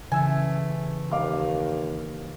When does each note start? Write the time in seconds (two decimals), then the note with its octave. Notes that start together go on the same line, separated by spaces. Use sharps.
0.12 C#3 E3 A3 E5 G#5
1.11 D#2 F5 D6